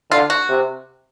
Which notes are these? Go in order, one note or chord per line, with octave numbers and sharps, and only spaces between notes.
D3 F4
F#4
C3